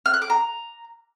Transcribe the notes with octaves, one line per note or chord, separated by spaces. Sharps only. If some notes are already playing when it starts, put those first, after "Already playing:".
F6
F#6
D6
A#5